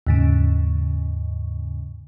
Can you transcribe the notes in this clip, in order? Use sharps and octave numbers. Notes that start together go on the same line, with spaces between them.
D#2 G#2 C#3